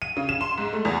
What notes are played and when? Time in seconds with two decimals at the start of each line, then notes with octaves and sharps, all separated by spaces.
0.02 D#7
0.17 C#3
0.29 E7
0.41 C6
0.58 G#2
0.73 A3
0.85 E2